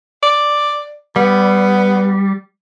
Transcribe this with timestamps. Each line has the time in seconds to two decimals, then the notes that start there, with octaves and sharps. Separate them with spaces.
0.23 D5
1.16 G3 B3